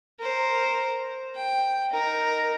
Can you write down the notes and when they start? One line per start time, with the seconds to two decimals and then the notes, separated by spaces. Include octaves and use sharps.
0.19 A#4 C5
1.35 G5
1.91 D#4 A#4